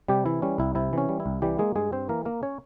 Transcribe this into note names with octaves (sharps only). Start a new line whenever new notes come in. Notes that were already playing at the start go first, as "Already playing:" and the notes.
C3 G3 G4
E3 E4
G3 C#4
C2 E4
C3 E4
E3 C#4
G3
E4
C2
E3 G3 G4
G#3 A#3 G#4
G2 G#3 G#4
G2 C4 C5
E3 A#3 A#4
A#3 A#4
C#4 C#5